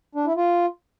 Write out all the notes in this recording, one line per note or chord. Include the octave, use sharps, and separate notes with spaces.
D4
E4
F4